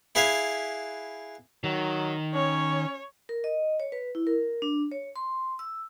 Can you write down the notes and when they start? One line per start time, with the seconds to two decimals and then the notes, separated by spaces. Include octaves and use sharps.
0.15 E4 G#4 B4 E5 F5
1.64 D#3 F#3
2.34 C#4 C#5
3.29 A#4
3.44 D#5
3.80 C#5
3.92 B4
4.15 E4
4.27 A#4
4.62 D4
4.92 C#5
5.16 C6
5.59 E6